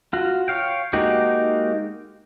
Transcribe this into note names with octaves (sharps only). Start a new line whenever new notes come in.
F4 F#4
C#5 F5 G5
G#3 A#3 D#4 F#4 G4